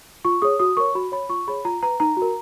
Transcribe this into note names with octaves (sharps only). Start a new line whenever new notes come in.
F4 C#6
G#4 C#5 D#6
F#4 D#6
A#4 C#5 C#6
F#4 B5
C#5 B5
F4 C#6
G#4 C#5 B5
F4 A#5
B4 A#5
D#4 A#5
F#4 A#4